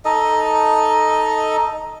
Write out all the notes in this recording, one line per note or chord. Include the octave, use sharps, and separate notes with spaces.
D#4 A4 D#5